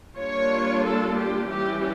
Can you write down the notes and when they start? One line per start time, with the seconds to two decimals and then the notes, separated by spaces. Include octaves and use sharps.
0.16 G3 A#3 D4 F4 C#5
0.84 A4
1.16 G4
1.49 E3 G3 C#4 E4 G4